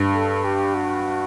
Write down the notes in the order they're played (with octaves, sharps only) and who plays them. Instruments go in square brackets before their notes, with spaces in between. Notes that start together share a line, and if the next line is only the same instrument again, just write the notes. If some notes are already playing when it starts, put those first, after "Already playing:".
Already playing: [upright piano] G2
[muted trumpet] A4
G4
F#4